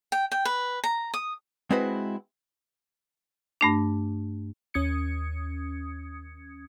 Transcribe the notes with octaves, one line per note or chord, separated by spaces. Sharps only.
G5
G5
B4
A#5
D#6
G#3 C4 E4 F#4 B4 C5
G2 A3 D4
D#2 C#4 D#6 G#6 C#7